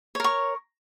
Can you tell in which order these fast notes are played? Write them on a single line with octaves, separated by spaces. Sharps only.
C#5 A#4 C#6